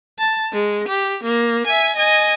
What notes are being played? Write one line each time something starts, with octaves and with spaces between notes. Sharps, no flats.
A5
G#3
G4
A#3
E5 G#5
D#5 G#5